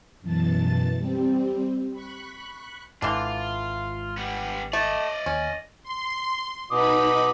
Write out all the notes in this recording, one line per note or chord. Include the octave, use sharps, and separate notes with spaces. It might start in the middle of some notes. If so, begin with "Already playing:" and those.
F#2 B2 E3 A5 A6
G3 C4
B5 C#6 F#6
G#1 G#2 D3 E3 F4
G3 B3
A3 D5 D#5
D#2 C#4
C6
B2 D#4 B5 D6 D#6